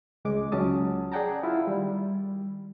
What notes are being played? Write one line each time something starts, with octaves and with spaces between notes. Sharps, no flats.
C#2 G#3 D6
C#2 F#3 C#4 A5 D#6
G#4 D5 F#5 G5 A5 A#5
E4 F4
D#3 G3